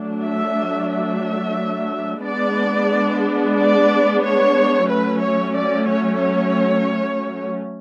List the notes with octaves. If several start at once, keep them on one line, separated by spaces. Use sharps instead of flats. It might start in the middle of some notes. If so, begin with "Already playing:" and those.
Already playing: F#3 A3 D4
E5
E5
G#3 B3 D4 D5
D5
C#5
F#3 A3 C#4 B4
C#5
D5
C#5
C#5